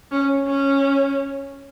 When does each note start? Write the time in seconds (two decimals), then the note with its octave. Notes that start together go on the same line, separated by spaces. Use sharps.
0.11 C#4
0.47 C#4